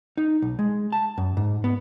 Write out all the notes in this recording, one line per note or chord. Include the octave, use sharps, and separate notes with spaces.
D#4
B1
G#3
A5
F#2
G#2
B3